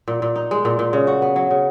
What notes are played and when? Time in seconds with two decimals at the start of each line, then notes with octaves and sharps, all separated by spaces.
0.08 A#2
0.22 A#2
0.36 D#4
0.51 G#3
0.65 A#2
0.79 A#2
0.93 C#3
1.07 F#4
1.22 B3
1.36 F#3
1.51 C#3